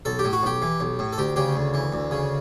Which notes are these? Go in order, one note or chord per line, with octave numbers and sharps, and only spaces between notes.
B1 A4
G4
A2
F#4
B1 G4
E3
B1
A2
A4
D2 G4
C#3 G4
D2
E3
D2
C#3